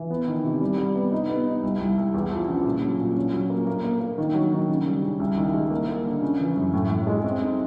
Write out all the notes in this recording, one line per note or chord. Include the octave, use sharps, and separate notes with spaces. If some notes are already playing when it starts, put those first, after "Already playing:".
Already playing: E3
B3
D#3
C3
G3
G3
B3
D#4
B3
D#4
C2
C2
C2
E2
F3
C#3
A#2
F#3
A#2
C#4
F#3
A#3
A#3
A#3
A#3
D#3
F#3
D#3
C#3
G3
C#3
C2
D#3
G#3
A#3
A#3
D3
C#3
E3
F#2
A2
A2
G#3
C4
D#4